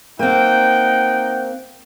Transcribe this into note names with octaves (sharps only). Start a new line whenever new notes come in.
A#3 C4 D#4 F#5 G5